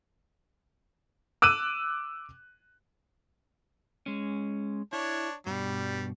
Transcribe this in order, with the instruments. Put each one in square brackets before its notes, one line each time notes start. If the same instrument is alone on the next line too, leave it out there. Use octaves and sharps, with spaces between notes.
[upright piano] D6 E6 F#6 D#7
[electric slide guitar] G#3 C#4
[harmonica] D4 C#5 [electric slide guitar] E4
[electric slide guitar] G2 B2 [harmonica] G3